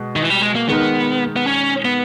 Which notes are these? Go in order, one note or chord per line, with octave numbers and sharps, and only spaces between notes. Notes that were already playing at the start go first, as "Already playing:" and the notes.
Already playing: B2 G#3
D#3
E3
G3
G#3
A#3
D#3 G#3 B3 D#4 A#4
B3
C#4
B3